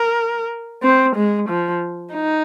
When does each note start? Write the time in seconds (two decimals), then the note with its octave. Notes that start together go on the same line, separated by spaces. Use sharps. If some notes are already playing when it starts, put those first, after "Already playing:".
Already playing: A#4
0.83 C4
1.16 G#3
1.49 F3
2.14 D#4